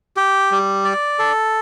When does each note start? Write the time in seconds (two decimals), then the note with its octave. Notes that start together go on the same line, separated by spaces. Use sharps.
0.17 G4
0.51 G3
0.85 D5
1.19 A4